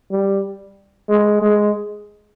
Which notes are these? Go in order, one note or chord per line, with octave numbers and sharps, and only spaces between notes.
G3
G#3
G#3